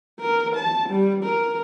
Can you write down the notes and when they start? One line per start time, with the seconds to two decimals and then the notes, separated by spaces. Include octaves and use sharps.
0.20 A#4
0.56 A5
0.89 G3
1.24 A#4